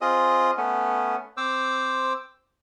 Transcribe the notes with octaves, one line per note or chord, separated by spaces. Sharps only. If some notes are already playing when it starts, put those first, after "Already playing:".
C4 F4 G#4 D#5 D#6
A3 B3 C#4
C4 C5 D6 E6